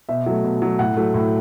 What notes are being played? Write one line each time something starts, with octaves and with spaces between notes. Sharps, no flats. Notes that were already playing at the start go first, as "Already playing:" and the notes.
B2 E5
F#3 A3
B2
F#3 A3
A2 F#5
F#3 A3
A2